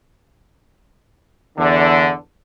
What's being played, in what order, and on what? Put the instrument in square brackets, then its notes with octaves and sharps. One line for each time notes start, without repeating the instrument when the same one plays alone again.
[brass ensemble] E2 D3